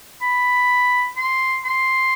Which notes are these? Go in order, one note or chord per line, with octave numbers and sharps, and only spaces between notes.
B5
C6
C6